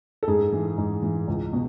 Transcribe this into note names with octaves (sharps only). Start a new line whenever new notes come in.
A4
G#2 G#4
E3
G#2
E3
C#2
B2